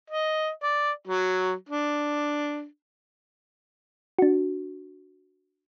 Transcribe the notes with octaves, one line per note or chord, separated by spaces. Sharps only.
D#5
D5
F#3
D4
D4 F#4